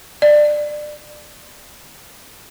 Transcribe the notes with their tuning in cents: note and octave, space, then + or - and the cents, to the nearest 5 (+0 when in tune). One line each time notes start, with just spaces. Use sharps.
D5 +20